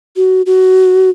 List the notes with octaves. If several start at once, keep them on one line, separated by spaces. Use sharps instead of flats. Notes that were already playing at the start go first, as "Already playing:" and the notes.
F#4
F#4